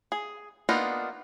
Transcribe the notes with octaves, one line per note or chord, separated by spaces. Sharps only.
G#4
A#3 B3 D4 D#4 F4